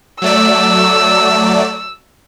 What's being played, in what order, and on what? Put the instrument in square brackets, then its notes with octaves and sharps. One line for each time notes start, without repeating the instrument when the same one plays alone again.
[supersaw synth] F#3 A3 D5 [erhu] E6